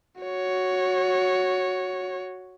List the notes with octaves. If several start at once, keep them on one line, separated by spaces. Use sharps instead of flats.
F#4 C#5